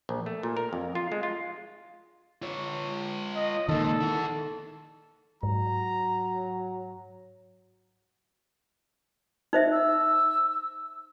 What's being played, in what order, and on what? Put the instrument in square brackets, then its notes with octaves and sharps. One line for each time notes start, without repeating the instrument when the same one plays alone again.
[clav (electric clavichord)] A#1
A3
A#2
A#4
F2
F4
G#3
F4
[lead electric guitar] F4 C#5
[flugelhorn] D#5
[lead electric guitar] C#2 A#2 [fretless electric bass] D#3 [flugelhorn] A4
[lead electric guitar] E4 F#5
[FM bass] G#2 [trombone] F#3 [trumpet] A#5
[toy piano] D#4 C5 E5
[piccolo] E6